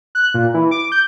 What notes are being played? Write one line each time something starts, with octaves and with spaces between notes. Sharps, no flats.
F#6
A#2
E3
D6
G6